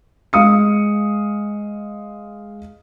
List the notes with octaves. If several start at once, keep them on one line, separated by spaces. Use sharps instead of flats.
G#3 F5 D#6 C#7